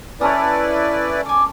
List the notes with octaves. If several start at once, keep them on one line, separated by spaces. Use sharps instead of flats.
C#4 E4 A4 B4 C#5 D5 D#6
D5 G#5